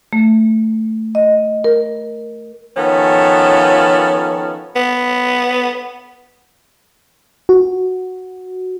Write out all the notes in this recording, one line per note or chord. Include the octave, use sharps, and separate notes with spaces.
A3
D#5
A#4
D#3 F3 B3 C#4 A4
B3
F#4